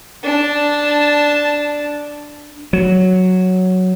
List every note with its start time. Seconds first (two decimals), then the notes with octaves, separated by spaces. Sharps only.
0.24 D4 A5
2.73 F#3